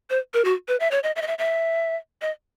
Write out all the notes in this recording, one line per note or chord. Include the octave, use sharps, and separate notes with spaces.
C5
A#4
F#4
B4
E5
C#5
D#5
E5
D#5
E5
E5
D#5